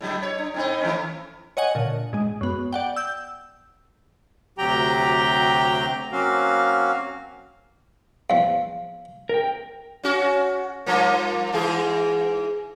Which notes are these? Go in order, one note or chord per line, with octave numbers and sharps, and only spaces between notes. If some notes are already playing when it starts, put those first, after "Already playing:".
A2 D3 F#3
C#5
D4
A2 C4 D#4
D#3 A3 C#4
C#5 D#5 F#5 G#5
A#2 D3
G#2 G#3
F#2 B3
D5 F#5 G5
E6 G6
D2 C3 F#3 G4 G5 A#5
F#3 A#3 C4 C#4 F#4 F5
E2 F3 F5
A#4 G5
C#4 F#4
G2 F3 A#3
G#2 E3 G#4